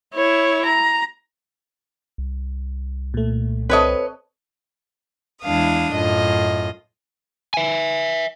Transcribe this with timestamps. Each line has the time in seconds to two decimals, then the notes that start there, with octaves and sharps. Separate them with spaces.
0.14 E4 C#5
0.65 A#5
2.18 C2
3.14 A#2 A3
3.70 C4 A4 B4 C#5 D#5
5.43 E2 G#3 D4 E4 F5 D#6
5.94 F#2 A2 F4 D#5
7.54 E5 G#5